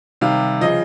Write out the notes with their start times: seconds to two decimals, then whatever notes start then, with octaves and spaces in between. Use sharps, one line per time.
0.21 C3 D#3 G3 F5
0.61 C#3 F3 D#5